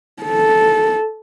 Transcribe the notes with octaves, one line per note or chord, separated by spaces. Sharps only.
A4